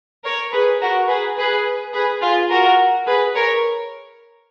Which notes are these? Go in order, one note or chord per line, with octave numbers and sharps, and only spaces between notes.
A#4 C#5
G#4 B4
F#4 A#4
G#4 B4
G#4 B4
G#4 B4
F4 G#4
F#4 A#4
G#4 B4
A#4 C#5